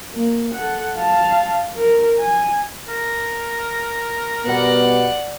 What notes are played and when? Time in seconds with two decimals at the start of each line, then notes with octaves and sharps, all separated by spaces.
0.14 A#3
0.55 A4 F#5
0.96 F5 A5
1.77 A#4
2.20 G#5
2.88 A#4
4.45 B2 G3 B3 D5 F#5